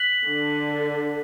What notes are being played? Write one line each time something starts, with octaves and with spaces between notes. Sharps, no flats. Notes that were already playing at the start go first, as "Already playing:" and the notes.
Already playing: F#6 B6 F#7
D3